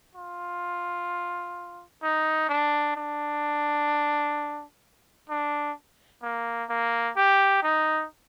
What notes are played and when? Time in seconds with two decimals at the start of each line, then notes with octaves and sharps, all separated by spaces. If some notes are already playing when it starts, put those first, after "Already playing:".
0.15 F4
2.03 D#4
2.49 D4
2.96 D4
5.30 D4
6.22 A#3
6.69 A#3
7.16 G4
7.63 D#4